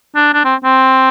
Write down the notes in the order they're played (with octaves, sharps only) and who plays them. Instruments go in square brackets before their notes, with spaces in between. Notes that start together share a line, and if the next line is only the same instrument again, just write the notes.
[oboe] D4
D4
C4
C4